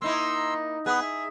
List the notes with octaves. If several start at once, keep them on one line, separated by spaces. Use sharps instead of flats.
A#3 D#4 E4 C6 E6
B3 G#4 B4
E5